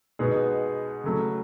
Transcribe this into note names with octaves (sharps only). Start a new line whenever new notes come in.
B2 G#3 B3 D#4 G#4
C#3 F#3 A3 C#4